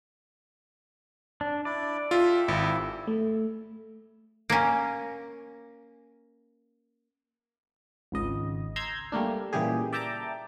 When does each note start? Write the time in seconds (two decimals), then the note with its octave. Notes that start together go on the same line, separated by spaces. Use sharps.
1.41 D4
1.65 D4 E4 D5
2.11 F4 G4 A4 E5
2.48 G#1 E4
3.07 A3
4.50 A#3 C#4
8.12 G#1 C#2 D#5
8.76 A#5 C6 E6 G6 G#6
9.12 G3 A3 A#3 D4
9.53 A#2 C#3 E3 G3 G4 G#4
9.93 D5 E5 G5 A5 A#5 D6